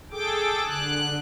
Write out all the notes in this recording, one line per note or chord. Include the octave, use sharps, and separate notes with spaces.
G#4 A4 G5 D6
D3 F#6